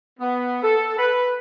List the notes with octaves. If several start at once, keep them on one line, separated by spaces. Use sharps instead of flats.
B3
A4
B4